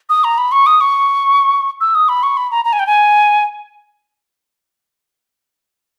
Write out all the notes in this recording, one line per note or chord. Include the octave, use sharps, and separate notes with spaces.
D#6
A#5
B5
C#6
D#6
C#6
E6
D#6
B5
C#6
B5
A#5
A#5
G#5
G5
G#5